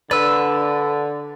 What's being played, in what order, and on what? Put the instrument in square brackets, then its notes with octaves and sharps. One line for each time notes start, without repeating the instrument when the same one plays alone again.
[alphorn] D3 [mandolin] B4 [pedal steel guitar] D5 E6